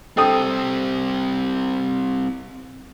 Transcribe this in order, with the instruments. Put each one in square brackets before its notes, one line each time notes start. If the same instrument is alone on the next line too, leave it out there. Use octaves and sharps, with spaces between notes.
[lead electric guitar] G3 C4 [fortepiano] A4 G5 D#6